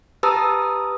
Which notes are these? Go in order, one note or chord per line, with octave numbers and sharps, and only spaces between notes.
G4 B4 A5 A#5 D#6 E6